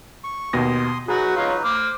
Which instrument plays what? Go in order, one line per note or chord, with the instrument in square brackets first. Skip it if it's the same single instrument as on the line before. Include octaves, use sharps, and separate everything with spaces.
[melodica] C#6
[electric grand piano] D#2 B2 A#6 [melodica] C6 D#6
[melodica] F#3 D#4 B4 [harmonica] F#4 [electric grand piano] G#4
[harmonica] F4 C#5 D#5
[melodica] C5 [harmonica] D6 F6